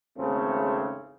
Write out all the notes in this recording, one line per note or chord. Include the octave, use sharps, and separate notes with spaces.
G#1 E2 C#3 A3 C4